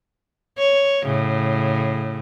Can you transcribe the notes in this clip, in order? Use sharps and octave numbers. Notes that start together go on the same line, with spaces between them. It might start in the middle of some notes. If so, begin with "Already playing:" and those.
C#5
A2 C#3